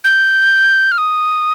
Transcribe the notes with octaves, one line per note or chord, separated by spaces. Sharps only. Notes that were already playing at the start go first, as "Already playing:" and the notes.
G6
F6
D#6